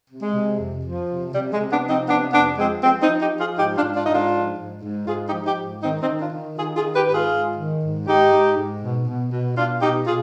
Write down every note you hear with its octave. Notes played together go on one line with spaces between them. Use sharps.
C3
G#3
C3
F2
F3
C3
C3 G3
G#3
C3
B3 D4
F3
C4 D#4
C3 B3 D4
F2 B3 D4
F3 G#3 C4
F3 G#3 C4
C4 D#4
F3
D#4 G4
F3
F4 G#4
G#2 D#4 G4
D4 F4
G#2
D4 F4
G#2 D#4
D4 F4
F3
G#2
G#2
G#2 F4 G#4
D#4 G4
F3
D#4 G4
G#2
D#3 C4 D#4
C4 D#4
D#3
D4 F4
D#3
D#3 F4 G#4
F4 G#4
D#3
G4 B4
G#2 B4
F4 G#4
G#2
D#3
G#2
G#2 D#4 G4
G#2
G#2
B2
B2
B2
B2 D4 F4
B2 D#4 G4
B2 F4 G#4